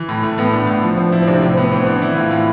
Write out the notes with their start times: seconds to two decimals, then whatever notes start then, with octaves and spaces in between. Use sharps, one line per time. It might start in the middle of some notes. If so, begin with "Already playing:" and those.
Already playing: E3
0.09 A2
0.23 A2 A3
0.38 A2 B3
0.53 A2 D4
0.67 A2
0.83 F3
0.97 F3
1.12 F3 E4
1.22 C4
1.27 C3 D4
1.42 A2 C4
1.57 A2 B3
1.72 E3 C4
1.87 E3 D4
2.02 E3 E4
2.16 A2 F4
2.31 A2